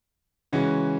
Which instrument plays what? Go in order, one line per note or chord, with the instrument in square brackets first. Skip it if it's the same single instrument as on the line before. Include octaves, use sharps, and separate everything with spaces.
[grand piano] C#3 E3 G#3 C#4 F#4